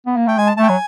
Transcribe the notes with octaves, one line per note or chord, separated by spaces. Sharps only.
B3
A#3
A3 G5
G#3 G#5
A5
A3 A5
G5
F#3 G#5